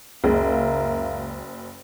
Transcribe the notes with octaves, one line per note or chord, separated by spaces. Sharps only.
F#1 C#2 G#4 A#4 E5 F5